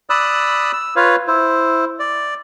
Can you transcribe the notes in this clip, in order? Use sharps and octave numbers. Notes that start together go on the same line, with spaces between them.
D5 B5 D#6 E6 F#6
E6
F4 B4 C#5 F5
E4 C5
D5